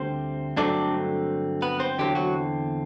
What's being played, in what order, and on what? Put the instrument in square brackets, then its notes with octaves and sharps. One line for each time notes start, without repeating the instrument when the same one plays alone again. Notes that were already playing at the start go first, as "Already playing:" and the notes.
Already playing: [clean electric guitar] D2 D3 G3 C4 C5
G2 D3 F#3 A3 C4 D4 D5
B3 B4
C4 C5
E2 D3 F#3 G3 C4 G4
F#3 F#4